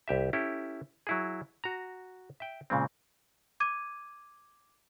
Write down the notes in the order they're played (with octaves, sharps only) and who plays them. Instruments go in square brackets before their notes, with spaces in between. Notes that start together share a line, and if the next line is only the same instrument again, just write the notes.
[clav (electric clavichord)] C2 G4 E5
C#4 E4 G4 A4
F#3 E4 G#4
F#4 A#5
E5 G5
A#2 C#3 G#3 C4
[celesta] D6 G#6 D#7